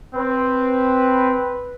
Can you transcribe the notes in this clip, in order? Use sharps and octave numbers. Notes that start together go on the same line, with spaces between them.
C4 B4